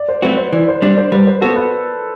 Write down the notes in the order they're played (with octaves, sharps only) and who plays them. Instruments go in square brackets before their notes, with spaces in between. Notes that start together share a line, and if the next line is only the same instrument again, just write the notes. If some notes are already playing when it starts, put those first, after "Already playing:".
Already playing: [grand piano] D5
C5
[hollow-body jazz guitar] F#3 A3 C4 F#4 [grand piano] B4
[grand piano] C5
[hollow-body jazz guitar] E3 [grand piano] D5
[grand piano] C5
[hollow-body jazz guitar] G3 D4 [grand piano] D5
[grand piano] C5
[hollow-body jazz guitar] G3 [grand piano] B4
[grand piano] C5
[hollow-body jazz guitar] B3 F#4 [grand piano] A4
[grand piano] B4